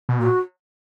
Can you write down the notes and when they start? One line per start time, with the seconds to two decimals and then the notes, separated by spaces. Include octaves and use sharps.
0.09 B2
0.19 A#2 F#4